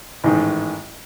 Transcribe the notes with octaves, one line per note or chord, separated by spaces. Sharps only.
A1 G#2 D#3